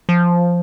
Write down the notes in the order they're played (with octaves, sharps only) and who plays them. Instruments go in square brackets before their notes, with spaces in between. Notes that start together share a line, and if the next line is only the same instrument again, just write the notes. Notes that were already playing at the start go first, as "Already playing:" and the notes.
[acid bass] F3